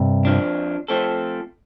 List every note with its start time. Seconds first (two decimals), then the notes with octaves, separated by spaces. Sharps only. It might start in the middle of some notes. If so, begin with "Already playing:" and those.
Already playing: G2 C3
0.25 F2 F3 D4
0.88 F3 A3 C4 A4